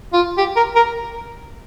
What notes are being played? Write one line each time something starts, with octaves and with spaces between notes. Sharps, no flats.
F4
G4
A#4
A#4